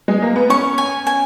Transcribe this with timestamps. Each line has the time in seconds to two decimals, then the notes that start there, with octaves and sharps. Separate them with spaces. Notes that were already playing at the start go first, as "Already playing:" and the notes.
0.08 G#3
0.22 A#3
0.36 B3
0.50 C#4 C#6
0.78 G#5
1.07 G#5